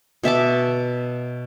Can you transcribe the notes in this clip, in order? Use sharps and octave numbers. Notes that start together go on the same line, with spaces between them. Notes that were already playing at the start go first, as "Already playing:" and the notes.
B2 E5 A5 D6